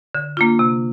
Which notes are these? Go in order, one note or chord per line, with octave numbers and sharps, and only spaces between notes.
D3
A#3 D4 F4
C3